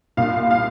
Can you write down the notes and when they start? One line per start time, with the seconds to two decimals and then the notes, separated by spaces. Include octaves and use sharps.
0.17 C2 A#2 F5
0.51 F5